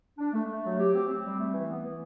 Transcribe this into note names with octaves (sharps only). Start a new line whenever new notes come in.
D4
A3
A3
F#3
G4
C4
C4
G3
A3
E3
B3
E3